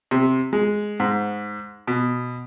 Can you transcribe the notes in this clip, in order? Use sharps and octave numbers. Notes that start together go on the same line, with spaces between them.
C3
G#3
G#2
B2